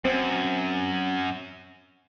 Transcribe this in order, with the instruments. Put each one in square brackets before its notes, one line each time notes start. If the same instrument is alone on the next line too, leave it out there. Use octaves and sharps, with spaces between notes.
[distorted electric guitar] F#2 [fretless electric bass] C4